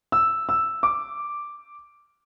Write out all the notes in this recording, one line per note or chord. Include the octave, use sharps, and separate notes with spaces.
E6
E6
D6